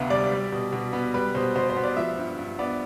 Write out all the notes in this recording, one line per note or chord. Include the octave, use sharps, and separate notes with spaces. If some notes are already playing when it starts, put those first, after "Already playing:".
Already playing: D2 C3 B3 E5 F5
G3 D5
G3
B2
B2
B3
G3 B4
B2 C5
B2 C5
C5
B3
D5
F3 E5
G2
G2
B3 D5